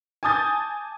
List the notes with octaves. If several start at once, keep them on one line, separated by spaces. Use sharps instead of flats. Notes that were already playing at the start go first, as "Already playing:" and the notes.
G#5 A5 D6 D#6 G6 A6